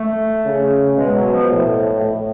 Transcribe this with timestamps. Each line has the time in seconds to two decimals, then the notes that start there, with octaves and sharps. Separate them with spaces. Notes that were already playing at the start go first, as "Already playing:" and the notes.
Already playing: A3
0.46 C#3
0.97 B2 G#3
1.16 F#3
1.32 F3
1.51 A2
2.02 A2